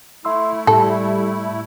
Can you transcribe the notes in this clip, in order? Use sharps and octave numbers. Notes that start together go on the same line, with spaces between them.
A3 E4 E5 C6 E6
A2 G3 A4